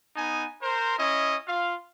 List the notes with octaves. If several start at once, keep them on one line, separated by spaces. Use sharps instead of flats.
B3 D#4 G#5
A#4 C5
C#4 E4 D#5
F4 F5